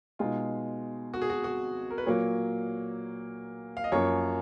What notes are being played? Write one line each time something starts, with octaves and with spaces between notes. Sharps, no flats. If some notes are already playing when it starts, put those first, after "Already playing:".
B2 G#3 D#4 F4
F#4
G#4
F#4
F#4
A#4
B4
A#2 F#3 A#3 C#5
F5
D#5
F#2 F3 A#3 C#4 C#5